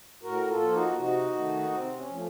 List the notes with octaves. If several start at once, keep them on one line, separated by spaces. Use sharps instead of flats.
A2 F#4 A#4
F4 A4
F3 A#3
D#4 F#4
C3 D#4 F#4
D#3 A3
C3 C4
C#4
F3 A3